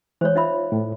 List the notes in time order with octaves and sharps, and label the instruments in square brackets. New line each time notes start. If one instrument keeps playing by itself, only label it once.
[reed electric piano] E3 G#3 [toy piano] C5 C#5
[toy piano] D#4 E5 B5 [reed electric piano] F4
[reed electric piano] A2